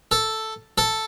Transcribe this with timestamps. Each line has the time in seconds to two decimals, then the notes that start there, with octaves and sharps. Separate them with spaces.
0.11 A4
0.78 A4